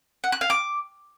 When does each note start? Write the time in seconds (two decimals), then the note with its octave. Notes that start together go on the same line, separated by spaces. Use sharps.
0.24 F#5
0.32 F#6
0.41 F5
0.50 D6